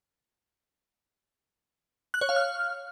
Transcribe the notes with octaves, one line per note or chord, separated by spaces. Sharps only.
F#6
C#5
F5
F6